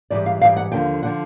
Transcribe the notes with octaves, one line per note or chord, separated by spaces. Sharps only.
G#2 E3 G3 D5
F5
G#2 E3 G3 F5
F#5
D#2 D3 F3 G5
D3 F3 F#5